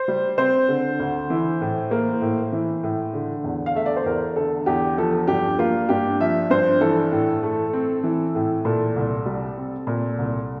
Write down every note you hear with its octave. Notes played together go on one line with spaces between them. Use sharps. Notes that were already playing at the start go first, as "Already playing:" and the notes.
Already playing: C5
G3
C4 C5
D3
D2
E3
A2
A#3
A2
E3
A2
D3
E2
F5
A3 E5
D5
C5
E2 A#4
D3 A4
E2 G4
F3 A4
G2 G4
A#3 F4
G2 G4
F3 E5
G2 C5
E3 A4
A2
A3
C4
E3
A2
A#2 A4
C2
G3
C4
A#2
C2